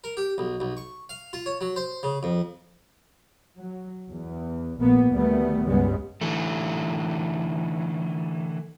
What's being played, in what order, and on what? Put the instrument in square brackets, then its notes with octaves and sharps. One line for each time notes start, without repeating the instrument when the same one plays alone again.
[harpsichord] A#4
G4
B1
B1
C#6
F5
F4
C#5
F#3
C5
C#3
F2
[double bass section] F#3
E2
A#1 A#3 B3
D2 D#3 G3 A3 B3
C#2 G2 C#3 G3 G#3 B3
[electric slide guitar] D3 E3 A3